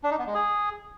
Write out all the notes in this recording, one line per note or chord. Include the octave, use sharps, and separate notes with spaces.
D4
D#4
B3
G#3
G#4